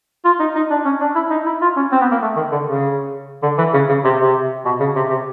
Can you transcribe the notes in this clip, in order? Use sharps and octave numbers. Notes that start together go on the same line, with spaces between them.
F4
D#4
D#4
D4
C#4
D4
E4
D#4
E4
F4
C#4
C4
B3
A#3
A3
D#3
D3
C#3
D3
E3
C#3
C#3
C3
C3
B2
C#3
C3
C3